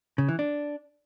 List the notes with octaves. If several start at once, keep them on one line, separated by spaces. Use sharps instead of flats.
C#3
E3
D4